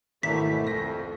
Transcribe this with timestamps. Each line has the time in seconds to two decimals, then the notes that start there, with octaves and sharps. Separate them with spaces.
0.23 G#1 B2 E3 A3 E4 C5 B6
0.67 C2 F2 A#6